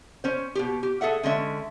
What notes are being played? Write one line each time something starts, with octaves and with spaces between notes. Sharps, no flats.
C#4 C5
B2 G4
G4
G#4 A4 E5 F#5
D3 G#3 C#4 E5